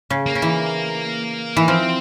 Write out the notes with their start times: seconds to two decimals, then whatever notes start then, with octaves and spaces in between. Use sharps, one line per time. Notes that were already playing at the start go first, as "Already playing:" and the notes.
0.10 C#3
0.26 A#3
0.35 C#3
0.42 E3
1.57 E3
1.68 F3 C4